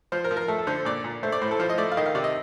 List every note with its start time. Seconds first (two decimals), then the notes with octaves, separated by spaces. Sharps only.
0.12 F3 C5
0.24 A#4
0.31 F3
0.37 A#4
0.48 A3 A4
0.58 A4
0.67 D3 C5
0.85 A#2 D5
1.04 A#2
1.23 A3 C5
1.32 D5
1.41 A2 C5
1.51 A4
1.60 F3 C5
1.70 D#5
1.78 A3 D5
1.92 F5
1.97 D#3 D#5
2.06 F5
2.15 C3 D5
2.24 D#5